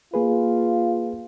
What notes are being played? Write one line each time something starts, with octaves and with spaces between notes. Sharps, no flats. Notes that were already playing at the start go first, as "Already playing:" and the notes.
A#3 F4 G#4 B4